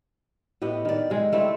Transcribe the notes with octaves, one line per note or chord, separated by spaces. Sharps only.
A2 B3 G4 D#5
D#3 D5
C3 G#3
G3 A3 C4 E4